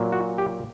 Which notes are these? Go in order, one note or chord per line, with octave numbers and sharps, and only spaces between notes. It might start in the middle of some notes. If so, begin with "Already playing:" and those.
Already playing: A#2 F#3
F#4
G4